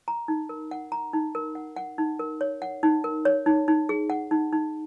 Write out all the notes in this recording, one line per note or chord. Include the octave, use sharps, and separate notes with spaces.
A#5
D#4
A#4
F#5
A#5
D#4
A#4
F#5
F#5
D#4
A#4
C#5
F#5
D#4
A#4
C#5
D#4
D#4
G#4
F#5
D#4
D#4